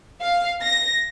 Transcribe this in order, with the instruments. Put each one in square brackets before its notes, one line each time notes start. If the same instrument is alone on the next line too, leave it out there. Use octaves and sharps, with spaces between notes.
[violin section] F5
A#6